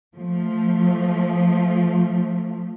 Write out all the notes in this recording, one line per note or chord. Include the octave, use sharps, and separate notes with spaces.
F3 A3